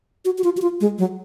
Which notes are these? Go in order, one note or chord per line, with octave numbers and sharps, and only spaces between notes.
F#4
F#4
F4
F#4
F4
G#3
F#3